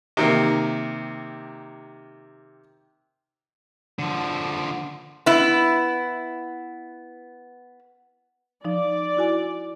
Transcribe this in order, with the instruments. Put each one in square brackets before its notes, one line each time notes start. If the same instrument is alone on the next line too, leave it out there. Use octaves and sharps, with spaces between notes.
[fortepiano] C3 D#3 A#3
[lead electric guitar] D3 F3
[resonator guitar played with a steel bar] B3 E4
[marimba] F3 D#4 [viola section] D5
[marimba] E4 F#4 G#5